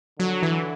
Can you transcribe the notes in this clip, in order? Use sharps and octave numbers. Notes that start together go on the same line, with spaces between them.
D3 F#3
E3